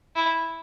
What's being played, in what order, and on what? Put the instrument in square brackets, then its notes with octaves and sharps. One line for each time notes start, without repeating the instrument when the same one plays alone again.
[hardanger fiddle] E4